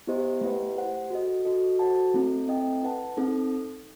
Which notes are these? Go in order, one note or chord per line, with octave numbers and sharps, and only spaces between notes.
B3 E4 G4 C5 D#5
A3 E4 G4 B4 F#5
G4 C5 F#5
F#4 A4 D#5
F#4 A4 D#5
F#4 A4 C5 F#5 A5
A3 C4 E4 A4
C4 E4 A4 D#5 G5
E4 B4 F#5 A5
C4 D#4 A4